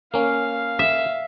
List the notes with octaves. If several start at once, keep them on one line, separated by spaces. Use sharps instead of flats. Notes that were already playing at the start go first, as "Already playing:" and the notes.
A#3 C#4 F5
E5